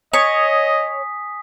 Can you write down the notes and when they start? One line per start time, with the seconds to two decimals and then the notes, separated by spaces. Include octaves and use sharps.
0.13 C#5 D#5 G#5 D#6 B6